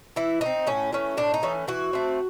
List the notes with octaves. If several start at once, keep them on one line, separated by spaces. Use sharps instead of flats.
E3 E4
A3 C4 D#4
A2 C#4
E3 A3 C#4
A2 D4
D#4
E3 A3 C#4
E3 F#4
A3 C4